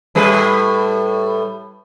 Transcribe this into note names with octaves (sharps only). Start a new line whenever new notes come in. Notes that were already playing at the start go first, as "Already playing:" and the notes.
A2 G3 B4